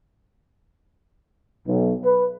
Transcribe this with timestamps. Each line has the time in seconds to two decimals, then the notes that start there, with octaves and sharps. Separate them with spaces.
1.66 B1
2.05 B4